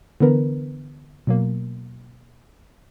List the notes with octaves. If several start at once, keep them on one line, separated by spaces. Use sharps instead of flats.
D3 E3 B3 A#4 B4
B2 F#3 A#3